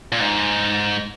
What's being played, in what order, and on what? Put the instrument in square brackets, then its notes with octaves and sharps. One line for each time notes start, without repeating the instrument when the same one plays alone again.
[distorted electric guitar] A#2
G#2